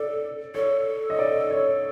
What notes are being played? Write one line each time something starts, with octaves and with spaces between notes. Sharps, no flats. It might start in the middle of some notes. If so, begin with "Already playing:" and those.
Already playing: A4 D5
A4 C#5
D#5
D5
C#5